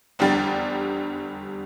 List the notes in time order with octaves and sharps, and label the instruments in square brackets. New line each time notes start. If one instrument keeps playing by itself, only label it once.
[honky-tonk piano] F1 E2 D3 G3 G5 A6